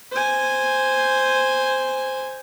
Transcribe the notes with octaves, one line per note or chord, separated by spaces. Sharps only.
C5 G#5